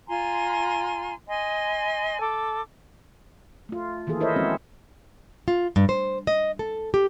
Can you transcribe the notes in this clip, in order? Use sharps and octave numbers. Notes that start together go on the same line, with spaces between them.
F4 G#5 A#5 C6
D#5 G#5 C6
A4 D6
A3 F4
D#3 E3 A#3 G#4 A4
E4 A#4 C5 C#5 D#5 E5
F3 G#3 C4 C#4 F#4
F4
G2
C5
D#5
A4
G4